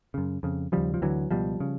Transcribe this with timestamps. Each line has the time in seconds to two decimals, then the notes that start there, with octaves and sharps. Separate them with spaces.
0.14 F#2 C#3
0.43 F2 C#3
0.72 D#2 C#3 F3 G3
0.94 F3
1.02 D2 D3 E3 F#3
1.31 C#2 B2 F3 G3
1.60 C#3